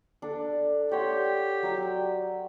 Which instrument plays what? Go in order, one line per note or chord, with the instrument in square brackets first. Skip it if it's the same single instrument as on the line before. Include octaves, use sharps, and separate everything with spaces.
[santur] D4 A4
[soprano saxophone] G4 [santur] C#5 F#5 C6
[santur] F#3 D5 E6